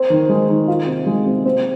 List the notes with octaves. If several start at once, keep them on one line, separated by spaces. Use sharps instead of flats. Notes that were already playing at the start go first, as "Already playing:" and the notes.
Already playing: C4
D#3
G#3
D#3
F4
C3
G#3
C3
C4